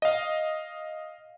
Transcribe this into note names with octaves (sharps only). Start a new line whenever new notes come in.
D#5 F5